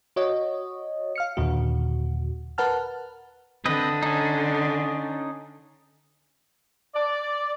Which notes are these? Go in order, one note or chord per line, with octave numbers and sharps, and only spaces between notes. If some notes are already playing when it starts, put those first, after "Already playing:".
F#4 C#5 D#5
F5 F6 C#7
D#2 A#2 D3 F#4
A#4 B4 F#5 A5 F6
D3 C4 B4 D#5
C#4 D#4
D5